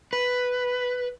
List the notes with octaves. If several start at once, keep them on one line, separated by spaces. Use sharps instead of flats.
B4